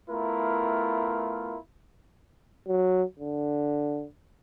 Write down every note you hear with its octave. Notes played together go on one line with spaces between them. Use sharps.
A3 B3 E4 F4 A#4
F#3
D3